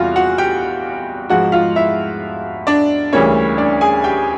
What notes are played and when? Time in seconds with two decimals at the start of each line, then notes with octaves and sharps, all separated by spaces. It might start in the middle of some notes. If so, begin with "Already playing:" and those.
Already playing: E2 C3 E3 G3 F4 F#4 F5
0.16 F#4 F#5
0.38 G4 G5
1.29 G#2 F3 G#3 F#4 F#5
1.52 F4 F5
1.76 E4 E5
2.67 D4 D5
3.12 D2 C#3 E3 G3 A#3 C#4 C#5
3.58 D4 D5
3.81 G#4 G#5
4.04 G4 G5